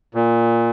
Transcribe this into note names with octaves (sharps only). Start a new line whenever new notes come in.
A#2